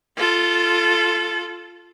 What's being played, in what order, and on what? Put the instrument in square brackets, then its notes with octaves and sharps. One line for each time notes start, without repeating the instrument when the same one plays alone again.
[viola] F4 A4